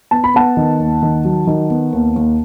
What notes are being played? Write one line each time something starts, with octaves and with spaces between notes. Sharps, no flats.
B3 A5
B5
B3 F#5 A5
D#3
D#2
D#3
F#3
D#3
B3
D#2
D#2